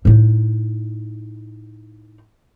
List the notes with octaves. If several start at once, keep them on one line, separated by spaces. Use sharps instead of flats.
A2 D#4